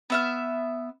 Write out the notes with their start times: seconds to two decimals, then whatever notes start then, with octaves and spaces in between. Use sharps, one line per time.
0.10 B3 E5 F6